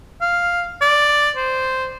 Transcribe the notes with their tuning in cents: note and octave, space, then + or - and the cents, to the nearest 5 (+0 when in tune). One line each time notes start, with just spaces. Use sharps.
F5 +0
D5 +0
C5 -5